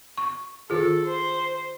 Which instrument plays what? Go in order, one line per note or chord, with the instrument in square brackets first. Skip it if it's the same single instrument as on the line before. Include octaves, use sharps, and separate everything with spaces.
[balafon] C#6
[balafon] D#3 F4 G#4 [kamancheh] A4
[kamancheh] C5